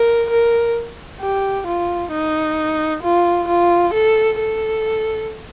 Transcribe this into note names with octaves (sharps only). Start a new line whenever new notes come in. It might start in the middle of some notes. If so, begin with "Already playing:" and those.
Already playing: A#4
A#4
G4
F4
D#4
F4
F4
A4
A4